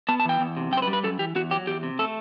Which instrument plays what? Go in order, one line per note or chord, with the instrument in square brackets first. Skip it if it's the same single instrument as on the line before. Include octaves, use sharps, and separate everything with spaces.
[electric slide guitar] B3 A5
A5
E3 G5
E2
C3
F#2 G5
C5
B4
G3
B4
F#2 A4
E3 G4
E2 F#4
F#3 G4
E2 G4
C3
A3 A4